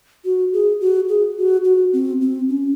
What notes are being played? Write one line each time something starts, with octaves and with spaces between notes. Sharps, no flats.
F#4
G#4
F#4
G#4
F#4
F#4
C4
C4
C#4